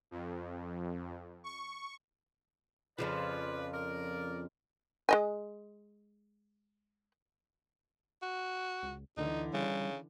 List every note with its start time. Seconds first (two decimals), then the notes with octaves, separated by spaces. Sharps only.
0.11 F2
1.44 C#6
2.98 F2 C#3 F3 B4 D5
3.74 A#4 D5
5.09 G#3 D#5 G#5
8.22 F#4
8.83 C#2
9.17 D2 D3 E3 D#4
9.54 C#3 G3